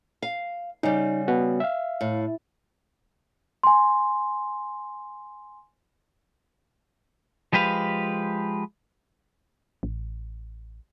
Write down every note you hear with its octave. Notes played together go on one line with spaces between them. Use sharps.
F5
C#3 G3 D#4
B3 F#4
E5 F5
A2
G#5 C6
F3 G#3 G4 B4 F5
A1